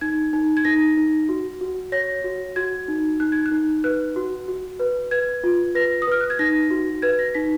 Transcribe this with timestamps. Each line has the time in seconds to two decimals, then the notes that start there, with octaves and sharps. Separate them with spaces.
0.01 D#4 G#6
0.33 D#4
0.57 G#6
0.65 D#4 A#6
0.97 D#4
1.29 F#4
1.61 F#4
1.92 C#5 A#6
2.24 F#4
2.56 F#4 G#6
2.88 D#4
3.20 D#4 F#6
3.32 G#6
3.46 F#6
3.51 D#4
3.84 B4 F#6
4.16 F#4
4.48 F#4
4.80 B4
5.11 B4 G#6
5.44 F4
5.75 B4 A#6
6.02 D#6
6.07 B4 F6
6.21 F#6
6.30 G#6
6.39 D#4 A#6
6.70 F#4
7.02 B4 G#6
7.19 A#6
7.34 D#4 B6